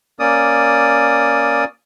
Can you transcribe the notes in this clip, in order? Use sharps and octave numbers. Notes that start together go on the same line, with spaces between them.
A#3 C#4 D5 D#6